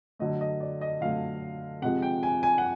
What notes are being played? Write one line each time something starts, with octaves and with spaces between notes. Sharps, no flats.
D3 F#3 A3 D#5
D#5
D5
D#5
D3 F#3 A3 F5
C3 F3 G#3 F#5
G5
G#5
G#5
F#5